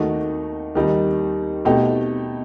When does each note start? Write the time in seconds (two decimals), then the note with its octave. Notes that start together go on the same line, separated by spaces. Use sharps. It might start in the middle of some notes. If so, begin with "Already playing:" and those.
Already playing: D#2 D#3 A3 D#4 F#4
0.75 D#2 D#3 G3 D#4
1.65 B2 A3 D#4 G4